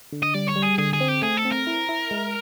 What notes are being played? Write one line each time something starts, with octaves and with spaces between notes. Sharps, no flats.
D3
D#5
G3 D5
C#5
G3
G#4
D3 G#4
G#4
C4
G4
A3 G#4
A4
C4
A#4
E4
E4
G#3